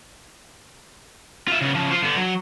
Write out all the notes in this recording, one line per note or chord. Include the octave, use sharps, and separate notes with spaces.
F4 E5
C#3 B3
C#3 F3
F4 C5
D3 B3
F#3